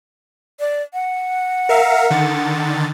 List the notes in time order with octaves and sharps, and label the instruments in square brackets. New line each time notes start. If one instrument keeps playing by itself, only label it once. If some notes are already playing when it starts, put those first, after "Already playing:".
[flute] D5
F#5
[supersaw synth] A#4 E5 F5
D3 D#3 A6